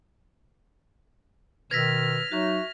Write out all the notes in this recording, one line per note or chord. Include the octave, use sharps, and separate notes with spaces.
B2 D#3 B4 E6 F6 G#6 A#6 B6
F#3 D#4 F#4 E5 C#6